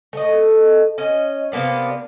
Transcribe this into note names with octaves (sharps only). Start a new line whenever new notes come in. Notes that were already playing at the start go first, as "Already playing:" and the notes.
A3 D#5
C#4 D#5
C3 A#3 B3 D4